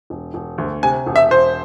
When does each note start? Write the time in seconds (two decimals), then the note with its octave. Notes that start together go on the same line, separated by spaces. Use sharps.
0.10 E1
0.34 E1
0.58 D2
0.83 C3 G#5
1.07 E1
1.16 E5
1.31 E1 C5